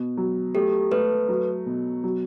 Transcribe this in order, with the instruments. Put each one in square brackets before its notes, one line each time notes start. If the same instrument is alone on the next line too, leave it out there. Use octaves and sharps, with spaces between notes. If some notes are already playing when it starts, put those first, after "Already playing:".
Already playing: [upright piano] B2
F#3
[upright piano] A3 [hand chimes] G4 A4
[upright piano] A3 [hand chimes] A4 B4
[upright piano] F#3
B2
F#3